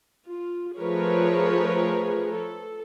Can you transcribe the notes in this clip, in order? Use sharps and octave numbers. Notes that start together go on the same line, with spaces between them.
F4
F3 A3 G#4 A#4 B4 C#5
A4